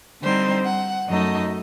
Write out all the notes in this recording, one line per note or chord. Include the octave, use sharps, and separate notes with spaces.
D3 G3 C4 D#4 C5
F#5
F#2 F#3 A3 D#4 D#5